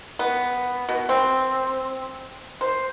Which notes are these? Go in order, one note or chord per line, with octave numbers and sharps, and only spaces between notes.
B3
B2
C4
C5